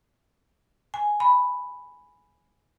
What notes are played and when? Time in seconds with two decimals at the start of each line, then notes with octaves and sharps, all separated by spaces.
0.94 G#5
1.20 B5